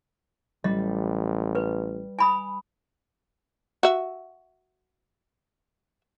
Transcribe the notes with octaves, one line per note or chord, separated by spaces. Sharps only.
A1 G3 D#5
B4
G#5 B5 D#6
F#4 E5